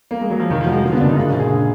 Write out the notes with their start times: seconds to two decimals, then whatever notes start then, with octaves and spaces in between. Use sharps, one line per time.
0.11 A#3
0.21 G#3
0.30 F#3
0.40 F3
0.50 F1 D#3
0.61 F3
0.66 F#3
0.72 G#3
0.83 D3 A#3
0.92 B3
1.01 F#1 D4
1.09 D#4
1.16 G#3 F4
1.29 F#4
1.33 A#1
1.39 G#4